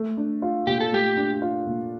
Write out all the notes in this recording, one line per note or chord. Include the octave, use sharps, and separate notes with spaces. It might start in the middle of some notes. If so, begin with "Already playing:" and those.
Already playing: A3
D4
F4
A#2 G4
A4
A3 G4
D4
F4
A#2